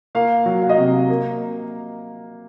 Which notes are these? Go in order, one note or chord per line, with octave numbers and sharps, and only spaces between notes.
A#3 F5
F#3
F5
D#5
C3 F5
A#3